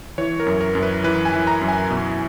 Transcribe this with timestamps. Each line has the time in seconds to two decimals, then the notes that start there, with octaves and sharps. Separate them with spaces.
0.18 E3 C#5
0.40 A#4
0.46 F#2
0.61 A#4
0.75 F#2
0.83 B4
1.04 E3 B4
1.25 G#5
1.33 E3
1.47 A#5
1.61 F#2
1.68 G#5
1.90 B2